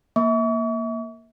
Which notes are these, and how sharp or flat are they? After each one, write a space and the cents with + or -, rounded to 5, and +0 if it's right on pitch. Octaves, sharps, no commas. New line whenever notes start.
A#3 +0 E5 -30 C#6 +40